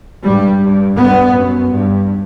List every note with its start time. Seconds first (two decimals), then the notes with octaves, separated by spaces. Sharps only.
0.24 G2 G3
0.61 G2
0.96 G2 B3
1.33 F#2
1.69 G2